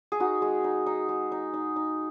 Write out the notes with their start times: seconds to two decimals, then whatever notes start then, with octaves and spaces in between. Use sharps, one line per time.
0.12 G#4
0.20 D#4 F#4
0.42 G#3
0.64 D#4
0.86 D#4
1.09 G#3
1.32 D#4
1.54 D#4
1.76 D#4